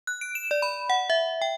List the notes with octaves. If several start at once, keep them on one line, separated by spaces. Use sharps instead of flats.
F#6
D7
E7
D5
B5
F#5
E5
G5